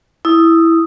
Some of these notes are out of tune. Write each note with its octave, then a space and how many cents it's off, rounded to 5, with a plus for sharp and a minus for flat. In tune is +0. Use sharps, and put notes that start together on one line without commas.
E4 +0 D#6 +0